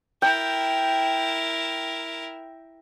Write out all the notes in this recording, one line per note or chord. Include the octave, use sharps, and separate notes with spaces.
E4 A#4 G5